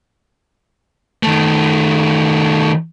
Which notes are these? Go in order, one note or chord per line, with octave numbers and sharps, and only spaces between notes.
D#3 A3